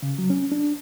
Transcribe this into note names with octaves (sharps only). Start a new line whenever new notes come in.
C#3
F#3
C#4
D4